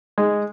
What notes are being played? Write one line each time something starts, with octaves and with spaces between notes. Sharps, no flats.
G#3